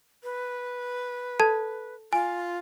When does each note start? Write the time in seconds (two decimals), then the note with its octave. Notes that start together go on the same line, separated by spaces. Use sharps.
0.23 B4
1.40 A4 A5 G#6
2.13 F4 G#5